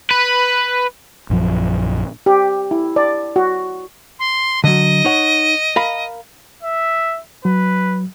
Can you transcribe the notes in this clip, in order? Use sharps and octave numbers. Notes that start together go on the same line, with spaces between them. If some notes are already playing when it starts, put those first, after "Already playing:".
B4
A#1 F#2 F3
G4
E4
D5
F#4
C6
D3 F#3 D#5
D#4 C#5 F#5
A#4 F5 B5
E5
F#3 B4